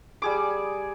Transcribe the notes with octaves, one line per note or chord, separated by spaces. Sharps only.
G3 G#4 D6